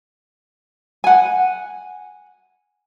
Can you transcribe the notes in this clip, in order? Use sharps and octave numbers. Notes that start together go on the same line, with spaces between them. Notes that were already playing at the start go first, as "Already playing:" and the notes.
F#5 G#5